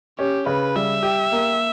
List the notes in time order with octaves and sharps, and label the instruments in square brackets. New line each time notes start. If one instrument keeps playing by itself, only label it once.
[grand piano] C#4 [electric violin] G4
[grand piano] C#3 [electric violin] B4
[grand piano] G3 [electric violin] E5
[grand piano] G4
A#3